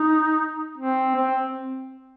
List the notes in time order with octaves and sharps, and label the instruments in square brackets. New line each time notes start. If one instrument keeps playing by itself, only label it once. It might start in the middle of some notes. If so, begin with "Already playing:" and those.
Already playing: [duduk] D#4
C4
C4